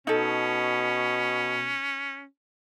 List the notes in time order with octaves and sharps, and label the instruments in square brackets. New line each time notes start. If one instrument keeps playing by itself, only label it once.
[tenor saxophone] B2 [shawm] C#4 [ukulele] D#4 A4